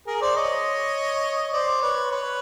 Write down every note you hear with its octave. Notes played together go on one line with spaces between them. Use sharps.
G#4 A#4
C5 D5
C#5 D#5
C5 D5
B4 C#5
B4 C#5